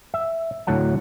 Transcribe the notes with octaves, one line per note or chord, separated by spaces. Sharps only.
E5
D2 A2 F#3 F#5 A5